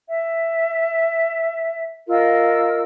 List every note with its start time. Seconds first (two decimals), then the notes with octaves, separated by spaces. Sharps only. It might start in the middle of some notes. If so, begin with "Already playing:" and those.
0.08 E5
2.08 F4 A#4 D#5 E6